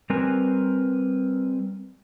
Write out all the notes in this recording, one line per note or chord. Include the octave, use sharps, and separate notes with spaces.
G3 C4 A#4 B4 G#5